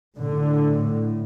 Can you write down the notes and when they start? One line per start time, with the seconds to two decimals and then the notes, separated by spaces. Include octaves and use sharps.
0.18 A2 D3